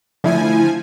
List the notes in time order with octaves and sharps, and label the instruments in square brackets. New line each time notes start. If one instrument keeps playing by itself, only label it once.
[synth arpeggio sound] D3 A3 E4 [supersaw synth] F3 G#5